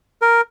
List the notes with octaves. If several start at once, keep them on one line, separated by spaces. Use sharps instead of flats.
A#4